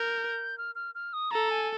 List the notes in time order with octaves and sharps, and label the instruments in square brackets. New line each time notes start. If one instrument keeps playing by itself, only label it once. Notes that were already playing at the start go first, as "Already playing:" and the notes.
Already playing: [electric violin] A#4 [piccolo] G6
[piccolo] F6
F6
F6
D#6
[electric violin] A4 [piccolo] A#5
[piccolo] G#5